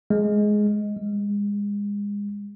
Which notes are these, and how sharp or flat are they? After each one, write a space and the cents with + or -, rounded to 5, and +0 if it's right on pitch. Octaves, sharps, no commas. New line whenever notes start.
G#3 +10
G#3 -30